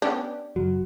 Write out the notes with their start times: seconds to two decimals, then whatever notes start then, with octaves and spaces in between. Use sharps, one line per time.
0.02 B3 C#4 D4 G4
0.56 F#1 F#3 F#4